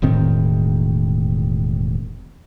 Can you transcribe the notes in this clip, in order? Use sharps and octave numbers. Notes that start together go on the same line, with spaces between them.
E1 A2 D#3 C4